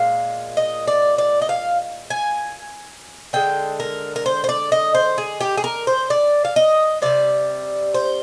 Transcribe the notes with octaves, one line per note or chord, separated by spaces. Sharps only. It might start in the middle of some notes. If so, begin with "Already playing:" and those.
Already playing: A#2 G#3 F5
D#5
D5
D5
D#5
F5
G#5
D3 G#3 G5
A#4
A#4
C5
C5
D5
D#5
C5
G#4
G4
G#4
A#4
C5
D5
F5
D#5
C3 G3 D5
C5